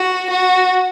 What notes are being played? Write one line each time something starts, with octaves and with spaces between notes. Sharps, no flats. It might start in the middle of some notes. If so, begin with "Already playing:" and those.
Already playing: F#4
F#4